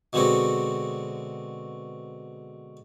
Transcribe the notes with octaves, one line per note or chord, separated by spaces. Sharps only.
B2 D3 G#3 C4 F#4